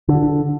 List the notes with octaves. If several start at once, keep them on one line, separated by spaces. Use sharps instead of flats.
D3